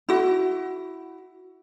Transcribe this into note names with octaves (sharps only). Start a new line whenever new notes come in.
E4 F#4